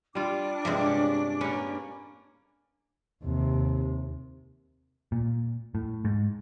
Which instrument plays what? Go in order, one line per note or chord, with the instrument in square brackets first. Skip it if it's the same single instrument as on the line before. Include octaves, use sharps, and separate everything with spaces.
[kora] G3 F4 [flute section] D4 D6
[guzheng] G2 C3 G#3
[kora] C#4
[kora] A#3 C#4 [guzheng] B4
[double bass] D#2 C3
[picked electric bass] A#2
A2
G#2